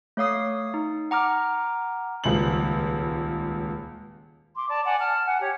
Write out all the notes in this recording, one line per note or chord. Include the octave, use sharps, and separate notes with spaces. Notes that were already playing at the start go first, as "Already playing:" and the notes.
A3 C#5 F5 D#6 C7
D#4
F#5 A#5 D6 F6
D#1 C#2 F#7
C6 D6
D5 A5
D5 F#5 G#5
A5 F6
F#5 G#5
G4 C#5